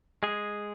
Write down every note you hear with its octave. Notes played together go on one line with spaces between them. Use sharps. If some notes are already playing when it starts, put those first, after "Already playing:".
G#3 G#4